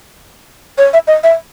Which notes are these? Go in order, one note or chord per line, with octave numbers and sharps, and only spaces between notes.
C#5
E5
D#5
E5